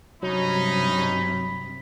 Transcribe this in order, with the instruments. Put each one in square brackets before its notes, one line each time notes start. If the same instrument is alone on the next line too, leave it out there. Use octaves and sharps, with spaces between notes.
[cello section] G2 C3 [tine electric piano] F#3 [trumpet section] C#4 D#4 [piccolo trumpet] B5